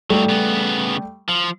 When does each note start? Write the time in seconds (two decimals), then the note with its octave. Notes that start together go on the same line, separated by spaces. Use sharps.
0.10 G#2 F#3 G3 A3
0.29 C#3 B3
1.29 F3